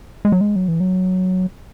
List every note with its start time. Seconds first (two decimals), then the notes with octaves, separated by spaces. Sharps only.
0.25 G#3
0.32 F#3
0.41 G#3
0.56 F#3
0.68 E3
0.80 F#3